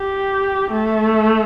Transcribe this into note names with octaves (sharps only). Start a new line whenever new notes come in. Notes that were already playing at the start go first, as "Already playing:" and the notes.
Already playing: G4
A3